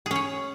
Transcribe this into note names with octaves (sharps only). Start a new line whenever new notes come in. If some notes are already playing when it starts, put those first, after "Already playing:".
C#4 G#4 C#5